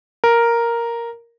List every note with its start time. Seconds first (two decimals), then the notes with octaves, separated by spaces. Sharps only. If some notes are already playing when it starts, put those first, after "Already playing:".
0.24 A#4